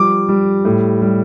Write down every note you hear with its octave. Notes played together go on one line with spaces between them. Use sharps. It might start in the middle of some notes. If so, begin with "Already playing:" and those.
Already playing: F3 G3 D6
G3
A2
G3